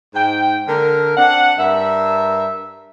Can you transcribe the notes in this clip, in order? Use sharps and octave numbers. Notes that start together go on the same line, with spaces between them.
G#2 G5
D3 A#4
C4 D4 F#5
G2 A#4 E5